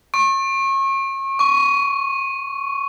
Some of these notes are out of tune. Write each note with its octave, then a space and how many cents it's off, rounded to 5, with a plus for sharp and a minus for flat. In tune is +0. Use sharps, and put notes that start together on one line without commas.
C#6 -35
C#6 +20